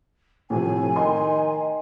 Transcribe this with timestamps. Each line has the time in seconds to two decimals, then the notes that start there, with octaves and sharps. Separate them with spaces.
0.50 A2 C3 F3 G#5
0.96 D#3 C6